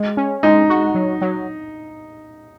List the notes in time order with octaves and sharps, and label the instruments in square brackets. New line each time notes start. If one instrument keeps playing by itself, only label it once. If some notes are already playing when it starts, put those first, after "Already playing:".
Already playing: [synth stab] G#3
C#4
[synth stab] G#3 [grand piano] D#4
[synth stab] F#4
F#3
F#3